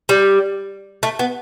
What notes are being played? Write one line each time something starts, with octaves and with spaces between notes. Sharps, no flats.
G3
A3
B3